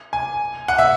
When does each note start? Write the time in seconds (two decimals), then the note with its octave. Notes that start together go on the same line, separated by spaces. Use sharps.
0.13 G#5
0.68 F#5
0.78 E5